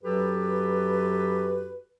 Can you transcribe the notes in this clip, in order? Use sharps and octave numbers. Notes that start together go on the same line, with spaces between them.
F#2 F#3 F#4 G4 A4 B4